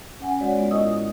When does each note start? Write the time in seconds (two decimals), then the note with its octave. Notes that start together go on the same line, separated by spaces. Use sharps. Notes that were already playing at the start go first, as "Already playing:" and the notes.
0.20 C#4 F#5 G#5
0.40 G#3 F#4 C#5 D5 F#5
0.57 G#3 B3 F4
0.71 A2 E4 A#4 D#5 D#6 E6
0.91 D#6